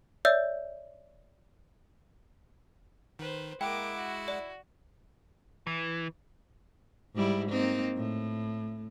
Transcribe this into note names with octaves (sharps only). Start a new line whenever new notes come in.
C#5 D5 E5 E6 G6
D#3 B4 C5
G#3 A#3 E4 F#5 G5 D6
F#4
D5
E3
G#2 G3 E4
A#3 C4 D#4
A2